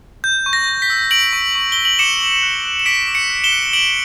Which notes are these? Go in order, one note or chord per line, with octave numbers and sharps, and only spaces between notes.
G6
C#6
A#6
C#6
B6
E6
G6 D7 F#7
C#6
C#6
E6 G7
F#7
D6 C#7 E7
D6
F#6
F#6
E7
D6 B6 D7
D6
C#7 E7
F#6
E7 G7
F#6
D6 D7 F#7